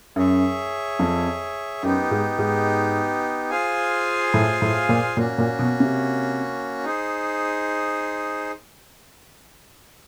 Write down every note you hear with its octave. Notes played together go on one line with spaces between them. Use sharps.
F#2 G#4 C#5 E5
F2
F#2 B3 D#4 G4
G#2
G#2
F4 G#4 C5 F5 G#5
A2
A2
A#2
A#2 A#3 C#4 F#4
A#2
B2
C3
D#4 G#4 C5